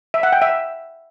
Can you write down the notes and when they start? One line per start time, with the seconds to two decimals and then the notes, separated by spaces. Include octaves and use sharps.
0.14 E5
0.23 F#5
0.32 G5
0.42 E5